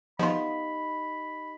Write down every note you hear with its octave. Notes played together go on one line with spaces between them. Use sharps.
F3 B3 D#4 F4 G4 D#5 B5